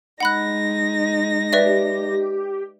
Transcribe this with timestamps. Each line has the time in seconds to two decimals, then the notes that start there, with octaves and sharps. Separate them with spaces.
0.20 G#3 D#4 F#5 B5 F#6 A#6
1.53 G4 B4 D5 E5